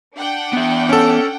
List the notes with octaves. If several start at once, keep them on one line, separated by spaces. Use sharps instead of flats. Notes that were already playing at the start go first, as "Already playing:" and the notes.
D4 F#5 G5
B3 E5
C#4 A4